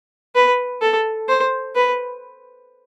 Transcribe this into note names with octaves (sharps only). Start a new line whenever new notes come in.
B4
A4
C5
B4